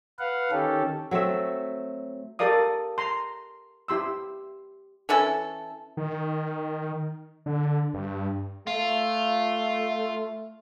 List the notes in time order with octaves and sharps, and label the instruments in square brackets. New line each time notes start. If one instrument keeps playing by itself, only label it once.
[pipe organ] B4 F5 F#5
D#3 C#4 G4 A4
[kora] F#3 A3 C4 E5
[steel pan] G4 A4 A#4 D5 F5 D#6
A#5 C6
E4 G4 C6 E6
[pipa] E3 C#4 E4 A4
[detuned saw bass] D#3
D3
G2
[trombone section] A3 [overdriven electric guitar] F4